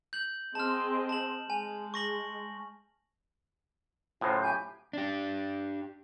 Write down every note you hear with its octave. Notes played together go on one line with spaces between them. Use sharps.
G6 F#7
C4 G#4 D#5 A5 F6
A5 F#7
G#3 G#5
C#6 A#6 F#7
A2 C#3 F#3 F4 C5
G4 G#5 G6
D4 G4